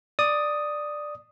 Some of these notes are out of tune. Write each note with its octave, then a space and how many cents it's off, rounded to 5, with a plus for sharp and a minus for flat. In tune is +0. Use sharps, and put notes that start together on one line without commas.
D5 +10 D#6 +0